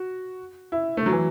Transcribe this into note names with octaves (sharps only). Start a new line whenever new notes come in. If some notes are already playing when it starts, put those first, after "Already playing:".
Already playing: F#4
E4
A3
F#3
E3